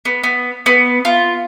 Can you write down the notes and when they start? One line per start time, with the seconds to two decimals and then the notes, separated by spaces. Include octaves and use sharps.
0.05 B3
0.24 B3
0.66 B3
1.05 F4